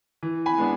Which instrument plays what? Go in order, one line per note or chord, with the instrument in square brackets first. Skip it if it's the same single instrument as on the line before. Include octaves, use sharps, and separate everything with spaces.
[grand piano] E3
G#5 B5
G#3 B3 D4